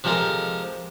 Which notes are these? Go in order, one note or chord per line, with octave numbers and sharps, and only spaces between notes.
C3 F3 G#3 A4 A#4